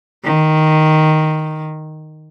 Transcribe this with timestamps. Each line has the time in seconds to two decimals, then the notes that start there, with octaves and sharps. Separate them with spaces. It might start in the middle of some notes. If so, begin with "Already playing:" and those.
0.24 D#3